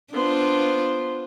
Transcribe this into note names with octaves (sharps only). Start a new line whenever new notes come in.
B3 D4 F4 C5